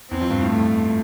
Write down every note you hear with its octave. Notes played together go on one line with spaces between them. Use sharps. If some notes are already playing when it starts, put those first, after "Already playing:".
E2 C4
F2
G2
A2
A3